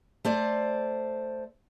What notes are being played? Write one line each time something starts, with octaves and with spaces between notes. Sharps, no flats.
A3 C5 D5